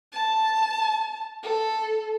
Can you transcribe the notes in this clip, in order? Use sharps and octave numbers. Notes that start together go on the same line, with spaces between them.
A5
A4